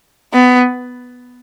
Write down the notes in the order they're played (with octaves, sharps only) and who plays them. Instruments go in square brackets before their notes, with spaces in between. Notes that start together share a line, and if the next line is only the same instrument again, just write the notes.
[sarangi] B3